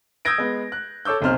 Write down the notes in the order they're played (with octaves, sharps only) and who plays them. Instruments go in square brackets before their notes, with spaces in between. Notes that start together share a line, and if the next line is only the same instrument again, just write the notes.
[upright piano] D#6 E6 G6 G#6 A#6 D7
G#3 B3
F#6
A4 C#5 D6 E6 G6
F#1 B1 C3 C5 F6